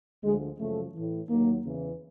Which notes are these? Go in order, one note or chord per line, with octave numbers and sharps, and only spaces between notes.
D2 D3 F3 G#3
F#2 C#3 F3 A3
A2 E3
D#2 D#3 F#3 A#3
E2 C#3 E3